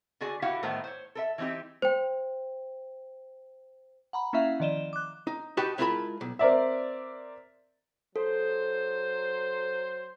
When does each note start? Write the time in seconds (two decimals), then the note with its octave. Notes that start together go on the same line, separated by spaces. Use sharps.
0.21 D3 F#4 G#4 D5 G#5
0.42 D3 E4 F#4 G4 F5 F#5
0.63 A2 D#3 A3 B3 C5 A#5
0.84 C5 C#5
1.15 A4 A#4 E5
1.38 E3 G3 C4 D#4 G4
1.82 C5 G5
4.13 F#5 A#5 B5
4.33 A#3 C#4 E4 E5 F5
4.60 D#3 F3 D5 D#5 E7 G7
4.93 D6 F#6
5.27 D#4
5.57 D#4 F#4 G4 B4 A5 B5
5.78 G#3 E4 F4 A#4 A5 B5
6.21 B1
6.39 C4 A#4 D5 E5
8.16 F#3 A4 C5